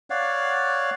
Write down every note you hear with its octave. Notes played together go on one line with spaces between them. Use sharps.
C#5 D5 F5 F#5